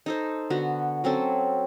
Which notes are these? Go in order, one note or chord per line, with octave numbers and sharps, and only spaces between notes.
D#4 A4 C5
D3 B3 F#4
F#3 C4 C#4 A4